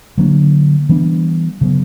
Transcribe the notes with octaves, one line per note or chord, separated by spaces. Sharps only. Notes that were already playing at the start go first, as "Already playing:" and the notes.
D3 F#3 A#3 D4
E3 G3 B3 D4
C#3 F#3 B3